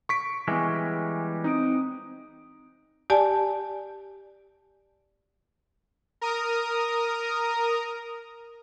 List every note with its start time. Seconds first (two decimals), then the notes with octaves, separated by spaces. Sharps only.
0.09 C#6 B6 D7
0.48 E3 G3 G#3 B3 G#5
1.44 C4 D#4 D#6 D7
3.10 G4 D5 G#5 A5
6.21 A#4 A#5 D#6